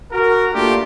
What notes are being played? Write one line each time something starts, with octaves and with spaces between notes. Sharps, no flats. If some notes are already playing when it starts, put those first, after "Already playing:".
F#4 A#4
A3 A#3 D4 F4 G4